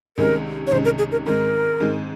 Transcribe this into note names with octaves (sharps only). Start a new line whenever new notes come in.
C2 C3 D#3 G#3 C#4 A#4
C#5
C2 C3 D#3 G#3 C#4 C5
A#4
G#4
A#4
G#2 D#3 G#3 C4 A#4
G#2 D#3 G#3 C4